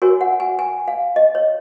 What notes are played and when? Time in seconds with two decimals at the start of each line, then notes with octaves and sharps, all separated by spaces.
0.02 F#4 A#4 C#5 G#5
0.21 F#5
0.40 G#5
0.59 G#5
0.88 F5
1.16 D#5
1.35 C#5